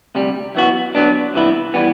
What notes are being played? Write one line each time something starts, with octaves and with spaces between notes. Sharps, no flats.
D2 C3 G3
F#2 E3 B3 F#4
D3 F#3 B3 D4
C2 C3 E3 B3 E4
E3 G3 B3